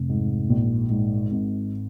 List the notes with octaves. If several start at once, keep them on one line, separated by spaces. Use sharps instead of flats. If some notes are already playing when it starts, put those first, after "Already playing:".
Already playing: F1
G#2
A#1
G#2
G#1